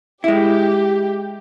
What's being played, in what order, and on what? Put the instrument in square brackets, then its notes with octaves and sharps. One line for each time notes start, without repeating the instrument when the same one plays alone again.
[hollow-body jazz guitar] G#3 E4 [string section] G4